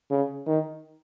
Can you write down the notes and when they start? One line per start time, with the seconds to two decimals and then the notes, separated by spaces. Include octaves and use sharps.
0.11 C#3
0.47 D#3